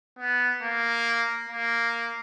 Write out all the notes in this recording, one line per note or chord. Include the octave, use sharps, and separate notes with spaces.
B3
A#3
A#3